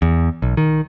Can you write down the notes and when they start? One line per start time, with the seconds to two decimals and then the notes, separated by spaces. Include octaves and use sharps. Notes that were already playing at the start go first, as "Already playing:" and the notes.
0.02 E2
0.42 B1
0.57 D#3